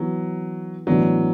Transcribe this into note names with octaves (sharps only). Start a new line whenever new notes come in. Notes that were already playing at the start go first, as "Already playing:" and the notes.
Already playing: E3 F#3 B3 F#4
A2 E3 F#3 B3 D4